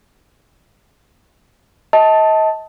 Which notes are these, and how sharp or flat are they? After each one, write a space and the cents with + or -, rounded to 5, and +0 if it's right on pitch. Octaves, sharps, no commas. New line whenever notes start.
D#5 +35 A5 +0